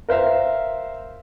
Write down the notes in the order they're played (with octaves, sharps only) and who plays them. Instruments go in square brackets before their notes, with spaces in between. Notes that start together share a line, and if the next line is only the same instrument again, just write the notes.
[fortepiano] A#4 C5 E5 F5